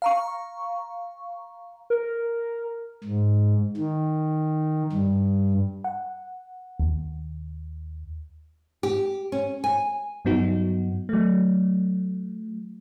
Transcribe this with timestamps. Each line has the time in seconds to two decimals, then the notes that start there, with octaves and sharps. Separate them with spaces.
0.02 F5 A#5 C#6
1.90 A#4
3.04 G#2
3.77 D#3
4.93 G2
5.84 F#5
6.80 D#2
8.83 G4
9.32 C#4
9.64 G#5
10.25 G2 F#3 B3 D#4 F#4
11.09 F#3 A3